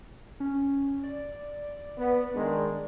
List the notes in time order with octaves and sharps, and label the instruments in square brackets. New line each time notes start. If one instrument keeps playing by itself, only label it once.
[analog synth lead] C#4
D5
[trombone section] B3
D#3 G#3 D4